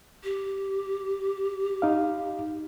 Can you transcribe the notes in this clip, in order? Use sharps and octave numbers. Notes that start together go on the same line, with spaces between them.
G4
D#4 F5